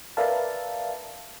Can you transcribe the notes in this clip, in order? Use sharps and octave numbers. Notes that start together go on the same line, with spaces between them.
A#4 B4 D5 E5 F5 A5